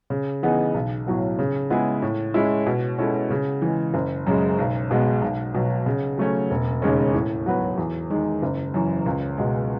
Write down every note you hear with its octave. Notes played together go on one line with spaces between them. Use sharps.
C#3
E3 B3 D#4 G#4
B1
A2 F#3 B3
C#3
G#3 B3 E4 G#4
A2
G#3 C#4 E4
B2
G#3 C#4 E4 A4
C#3
E3 G#3
F#1
F#2 C#3 G#3
B1
B2 G#3 B3
B1
B2 F#3
C#3
F#3 A3 C#4
E1
D#2 C#3 G#3 C#4
A2
F#3 B3 F#4 B4
E2
D#3 G#3
F#1
F#2 E3
C#2
B2 G#3